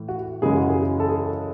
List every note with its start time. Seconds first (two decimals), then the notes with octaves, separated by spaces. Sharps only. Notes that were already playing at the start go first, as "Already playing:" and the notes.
Already playing: A2 E3
0.08 F#4
0.42 F#2 C#3 E3 G#3 G#4
0.56 F#4
0.69 G#4
1.00 A4
1.08 G#4